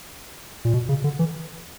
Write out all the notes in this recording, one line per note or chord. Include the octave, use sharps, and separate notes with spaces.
A#2
B2
C#3
D3
E3